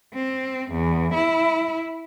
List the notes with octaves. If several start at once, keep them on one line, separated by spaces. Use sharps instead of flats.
C4
E2
E4